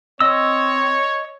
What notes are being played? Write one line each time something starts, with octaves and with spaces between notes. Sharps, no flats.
C4 C#5 D#5 E6